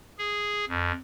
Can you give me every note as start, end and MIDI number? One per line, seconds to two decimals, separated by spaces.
0.18 0.65 68
0.69 0.92 41